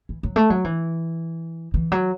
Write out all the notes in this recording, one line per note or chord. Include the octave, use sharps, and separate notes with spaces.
E3
F#3
A3
F#3
E3
E3
F#3